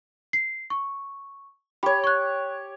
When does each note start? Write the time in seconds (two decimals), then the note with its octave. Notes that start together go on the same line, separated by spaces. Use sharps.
0.33 C7
0.70 C#6
1.83 G4 C#5 B5
2.04 C#6 F#6